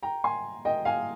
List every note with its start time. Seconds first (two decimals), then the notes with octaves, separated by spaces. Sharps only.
0.03 G5 A#5
0.24 G#5 C6
0.65 D#5 G5
0.85 F5 G#5